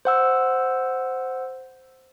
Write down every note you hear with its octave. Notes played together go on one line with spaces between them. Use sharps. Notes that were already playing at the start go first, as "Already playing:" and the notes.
C5 F#5 E6